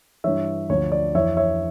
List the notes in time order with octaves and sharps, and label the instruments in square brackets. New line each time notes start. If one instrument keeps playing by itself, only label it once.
[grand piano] G2 E3 C#5 E5
D2 D3 F3 C#5
D5
F2 E3 C#5 E5
C#5 E5